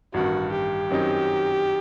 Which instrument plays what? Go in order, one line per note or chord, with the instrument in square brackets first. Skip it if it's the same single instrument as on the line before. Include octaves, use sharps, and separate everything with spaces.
[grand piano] A1 G2 D#3 [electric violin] F#4
[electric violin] G4
[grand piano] F#2 D#3 F#3 C4 D#4